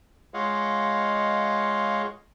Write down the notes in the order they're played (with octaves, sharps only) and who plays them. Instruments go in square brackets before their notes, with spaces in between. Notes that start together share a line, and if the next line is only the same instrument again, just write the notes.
[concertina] G#3 F4 C#5 D#5 F5 F#5